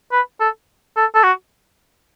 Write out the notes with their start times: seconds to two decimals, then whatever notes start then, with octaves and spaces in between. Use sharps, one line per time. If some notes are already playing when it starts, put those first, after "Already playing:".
0.12 B4
0.40 A4
0.97 A4
1.15 A4
1.24 F#4